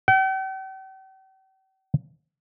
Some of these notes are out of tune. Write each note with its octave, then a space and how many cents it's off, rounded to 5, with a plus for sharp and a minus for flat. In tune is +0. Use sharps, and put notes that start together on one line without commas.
G5 -45